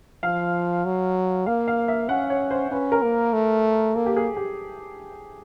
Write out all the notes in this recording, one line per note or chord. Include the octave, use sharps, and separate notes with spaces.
F3 F5
F#3
A#3 F5
F5
E5
C#4 F#5
C#5
C5
C#4 B4
A#4
A#3
A3
A#3 A4
G4
G#4
G4